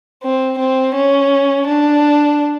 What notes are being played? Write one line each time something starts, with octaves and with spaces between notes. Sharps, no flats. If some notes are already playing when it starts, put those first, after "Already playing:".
C4
C4
C#4
D4